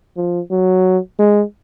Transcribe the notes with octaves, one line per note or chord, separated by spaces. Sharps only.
F3
F#3
G#3